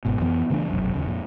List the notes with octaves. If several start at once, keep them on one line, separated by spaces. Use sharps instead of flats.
G1 G#2 B2
F2 E3 B3
C#3 E3 A3 D4
F1 B1 F#2
D#2 C#3
F2 A#2